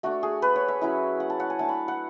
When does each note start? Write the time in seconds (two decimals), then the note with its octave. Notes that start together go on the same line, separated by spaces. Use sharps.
0.03 A3 D4 F#4
0.23 G#4
0.42 B4
0.56 C#5
0.68 E5
0.81 F#3 C#4 E4
1.20 F#5
1.30 A5
1.40 F#5
1.50 G#5
1.59 A3 D4 A5
1.69 B5
1.88 F#5